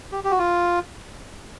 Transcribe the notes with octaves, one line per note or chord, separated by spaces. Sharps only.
G4
G4
F#4
F4